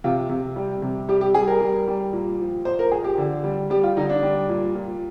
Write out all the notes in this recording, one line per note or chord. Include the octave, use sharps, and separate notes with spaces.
C3 F4
C3
G3
C3
G3 G4
G4
G3 G#4
A#4
G3
G3
A#2
F3
A#2 C5
A#4
A#2 G#4
G4
D3
G3
G3 G4
F4
D3 D#4
D4
G3
A#2
A#2